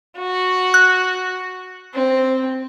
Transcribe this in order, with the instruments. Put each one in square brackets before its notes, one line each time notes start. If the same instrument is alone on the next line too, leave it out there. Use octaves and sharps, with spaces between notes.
[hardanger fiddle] F#4
[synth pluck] F#6
[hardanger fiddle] C4